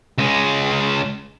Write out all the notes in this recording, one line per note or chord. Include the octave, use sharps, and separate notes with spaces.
C#2 G#3